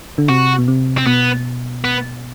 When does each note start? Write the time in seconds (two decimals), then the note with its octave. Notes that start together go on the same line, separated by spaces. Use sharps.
0.18 D3
0.29 C3 F#4
0.58 B2
0.68 C3
0.98 C4
1.06 B2 B3
1.84 B3